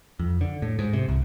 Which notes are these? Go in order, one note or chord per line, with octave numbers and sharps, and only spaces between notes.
F2
D3
A2
G#2
C3
C2